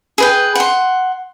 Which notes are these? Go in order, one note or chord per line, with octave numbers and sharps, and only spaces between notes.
G#4 B4 G5
F#5 C6